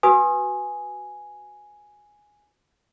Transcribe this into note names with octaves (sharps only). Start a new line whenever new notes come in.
F#4 B4 G#5 D#6